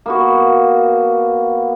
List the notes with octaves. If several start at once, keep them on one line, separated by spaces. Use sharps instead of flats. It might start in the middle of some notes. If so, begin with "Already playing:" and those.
A#3 B3 F#4